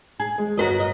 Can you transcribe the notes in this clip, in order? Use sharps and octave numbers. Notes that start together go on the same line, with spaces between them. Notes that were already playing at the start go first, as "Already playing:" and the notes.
G#4
G#3
G1 F#4 A#4 B4 D#5 A#5
D#5